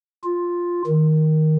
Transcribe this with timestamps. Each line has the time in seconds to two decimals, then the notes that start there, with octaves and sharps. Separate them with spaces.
0.24 F4
0.87 D#3